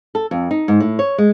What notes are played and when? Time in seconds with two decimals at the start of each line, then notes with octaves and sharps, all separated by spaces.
0.15 A4
0.31 F2
0.51 D#4
0.68 G#2
0.80 A2
0.99 C#5
1.18 G#3